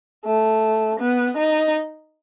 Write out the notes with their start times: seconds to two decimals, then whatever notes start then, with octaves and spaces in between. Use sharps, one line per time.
0.25 A3
1.00 B3
1.37 D#4